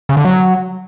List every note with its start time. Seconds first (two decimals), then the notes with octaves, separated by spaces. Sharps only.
0.09 C#3
0.17 D3
0.25 F#3